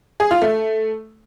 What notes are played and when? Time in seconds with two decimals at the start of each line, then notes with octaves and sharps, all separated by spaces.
0.20 G#4
0.31 F4
0.42 A3